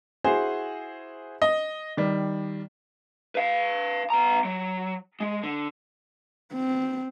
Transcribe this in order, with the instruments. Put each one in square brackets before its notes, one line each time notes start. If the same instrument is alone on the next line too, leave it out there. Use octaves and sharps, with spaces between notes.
[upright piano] E4 F#4 G#4 C5
D#5
D#3 G3
[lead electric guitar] B4 F5
B3 A#5
F#3
G#3
D3
[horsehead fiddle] C4